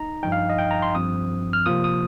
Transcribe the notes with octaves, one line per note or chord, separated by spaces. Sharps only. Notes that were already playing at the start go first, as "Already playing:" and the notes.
Already playing: D#4 A#5
G2 F3 D#4 G5
F5
D#5
G5
A#5
C6
G2 F3 C4 D#6
F6
C3 F3 A#3 F4 D#6
D#6